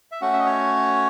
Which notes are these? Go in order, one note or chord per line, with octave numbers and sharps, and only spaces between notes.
E5
A3 C#4 F#4 F#5
E5
D#5
C#5